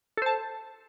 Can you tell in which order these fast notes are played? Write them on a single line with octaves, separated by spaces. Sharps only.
A4 C5 A5